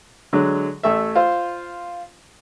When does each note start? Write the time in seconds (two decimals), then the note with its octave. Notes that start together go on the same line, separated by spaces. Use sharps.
0.33 D3 F#3 G#3
0.83 A1 A3 E5
1.15 F4 C5